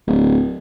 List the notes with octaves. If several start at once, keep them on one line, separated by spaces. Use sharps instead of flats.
D1